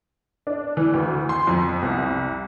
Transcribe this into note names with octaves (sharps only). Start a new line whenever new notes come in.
D4
E3
D2
C6
F2
C2